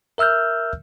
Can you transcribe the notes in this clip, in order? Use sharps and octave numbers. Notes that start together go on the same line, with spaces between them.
A#4 E5 E6 F6 G6